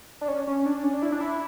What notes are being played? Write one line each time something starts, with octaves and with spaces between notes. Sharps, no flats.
D4
C#4
C#4
D4
C#4
D4
E4
D4
E4